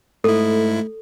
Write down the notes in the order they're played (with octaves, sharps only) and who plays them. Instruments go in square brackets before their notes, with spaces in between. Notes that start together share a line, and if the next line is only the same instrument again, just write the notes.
[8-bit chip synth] G#2 E4 [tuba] A3 [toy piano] A4